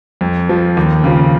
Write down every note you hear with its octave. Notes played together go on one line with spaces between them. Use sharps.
F2
F3
D#2
C#3 F3